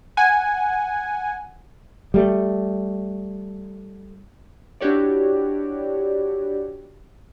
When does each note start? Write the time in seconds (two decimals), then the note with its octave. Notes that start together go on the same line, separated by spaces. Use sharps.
0.17 F#5 G#5
2.14 G3 A3
4.81 D4 E4 F#4 G4 C#5 D5